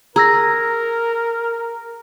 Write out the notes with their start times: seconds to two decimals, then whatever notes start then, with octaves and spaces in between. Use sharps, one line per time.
0.16 G#4 A#4 A#5 E6 A#6